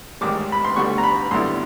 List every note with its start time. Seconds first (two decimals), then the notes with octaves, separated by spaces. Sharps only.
0.21 A1 G#2 D#3 G3 D6
0.52 B5
0.65 C6
0.76 D2 D3 G3 B3 C#6
0.98 A#5
1.04 B5
1.31 F#2 D3 G3 B3 E4 C6